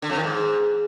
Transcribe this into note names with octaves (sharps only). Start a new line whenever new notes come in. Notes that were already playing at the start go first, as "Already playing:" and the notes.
D3
F2
D#3
G#2